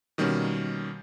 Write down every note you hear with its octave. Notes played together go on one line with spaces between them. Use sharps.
B2 D#3 G3 A#3 C#4